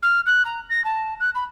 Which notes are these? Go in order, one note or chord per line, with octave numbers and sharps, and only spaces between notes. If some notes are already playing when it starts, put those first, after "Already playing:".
F6
F#6
A#5
A#6
A5
F#6
B5